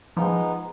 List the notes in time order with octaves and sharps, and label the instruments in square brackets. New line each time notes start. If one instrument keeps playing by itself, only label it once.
[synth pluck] F3 [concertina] G#3 B3 D#4